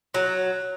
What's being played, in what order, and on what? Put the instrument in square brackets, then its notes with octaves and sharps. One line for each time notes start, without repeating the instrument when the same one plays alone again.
[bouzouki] F#3